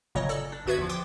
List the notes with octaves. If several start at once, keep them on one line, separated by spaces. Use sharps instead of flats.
G1 A#2 C#3 F#3 C#5 D#5
A4 D5 E6
D4
G1 B3 F#4 B4 E5 G#6
E2 F3
G5 C6 D6